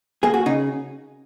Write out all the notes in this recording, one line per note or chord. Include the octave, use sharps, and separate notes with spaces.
A#3 G#4
F#4
C#3 D#4